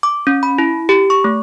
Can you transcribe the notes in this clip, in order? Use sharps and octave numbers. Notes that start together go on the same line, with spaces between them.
D6
C#4
B5
E4
G4
C#6
A3